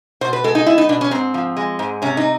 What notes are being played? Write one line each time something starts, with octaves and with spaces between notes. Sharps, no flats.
B2 C5
B4
G#3 A4
D#4
B3 E4
D#4
B2 D4
C#4
G#2 C4
F3
G#3
G#2
C3 C#4
D#4